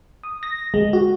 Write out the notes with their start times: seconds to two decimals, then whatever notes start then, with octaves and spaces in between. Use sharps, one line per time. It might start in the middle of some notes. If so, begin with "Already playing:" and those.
0.24 D#6
0.43 A#6
0.74 G#3
0.93 F#4